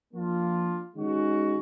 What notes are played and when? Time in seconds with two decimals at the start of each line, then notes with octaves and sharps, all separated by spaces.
0.14 F3 A#3 D4 F4
0.95 D#3 G#3 C#4 F#4